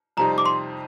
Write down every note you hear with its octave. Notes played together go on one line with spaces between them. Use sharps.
F2 C3 G3 C4 D#4 A#5
D6
C6